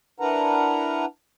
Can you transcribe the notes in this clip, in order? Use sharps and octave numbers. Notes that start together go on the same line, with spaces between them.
D4 E4 A#4 B4 F#5 A#5